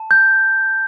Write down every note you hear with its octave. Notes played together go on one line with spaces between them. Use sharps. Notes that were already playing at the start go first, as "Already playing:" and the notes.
Already playing: A5
G6